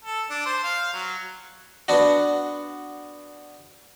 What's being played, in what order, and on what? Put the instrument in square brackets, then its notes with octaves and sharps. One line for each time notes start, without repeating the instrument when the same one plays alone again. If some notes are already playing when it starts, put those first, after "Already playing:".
[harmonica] A4
D4
C5
F5
F#3
[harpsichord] B3 D4 F#4